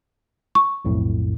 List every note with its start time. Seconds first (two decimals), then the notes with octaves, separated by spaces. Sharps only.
0.55 C#6
0.85 B1 F2 A2